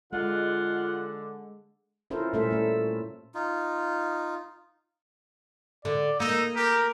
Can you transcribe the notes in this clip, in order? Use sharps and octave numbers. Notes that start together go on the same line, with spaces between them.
D3 G#3 F4 F#5
C#4 E4 F4 A4 A#4 C5
A#2 G3 A3 C#4 A4 E5
A3 E4
D#4 F4
D3 D5
A#3 D#4 E6
G4 A#4